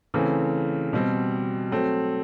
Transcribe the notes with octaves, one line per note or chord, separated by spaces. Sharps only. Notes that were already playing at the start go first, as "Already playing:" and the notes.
C#3 E3 A3 C4
B2 G3 C4
F#3 A3 C4